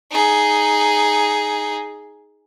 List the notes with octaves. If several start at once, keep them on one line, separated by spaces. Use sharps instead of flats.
D#4 G#4